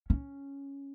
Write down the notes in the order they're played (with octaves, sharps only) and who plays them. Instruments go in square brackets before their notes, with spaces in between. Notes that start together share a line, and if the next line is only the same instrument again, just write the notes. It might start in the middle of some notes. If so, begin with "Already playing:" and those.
[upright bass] C#4